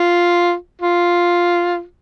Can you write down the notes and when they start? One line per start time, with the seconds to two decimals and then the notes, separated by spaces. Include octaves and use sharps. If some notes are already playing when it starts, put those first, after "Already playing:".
Already playing: F4
0.81 F4